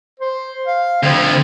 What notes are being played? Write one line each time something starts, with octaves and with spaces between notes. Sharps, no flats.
C5
F5
D2 F3 C4